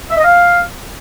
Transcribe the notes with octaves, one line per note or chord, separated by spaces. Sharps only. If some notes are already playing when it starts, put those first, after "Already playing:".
E5
D#5
F5